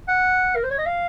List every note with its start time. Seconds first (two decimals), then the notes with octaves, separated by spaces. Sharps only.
0.08 F#5
0.56 A#4
0.63 C5
0.71 C#5
0.78 D#5
0.86 F5